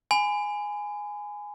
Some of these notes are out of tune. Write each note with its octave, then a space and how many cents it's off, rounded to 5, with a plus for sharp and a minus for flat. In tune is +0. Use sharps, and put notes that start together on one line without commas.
G#5 +0 B5 +40